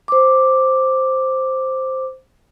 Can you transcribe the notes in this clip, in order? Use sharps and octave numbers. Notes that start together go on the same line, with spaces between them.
C5 D6